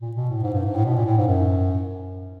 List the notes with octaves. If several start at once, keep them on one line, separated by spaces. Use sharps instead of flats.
A#2
B2
A2
G#2
G2
G#2
A2
B2
A#2
A2
G#2
F#2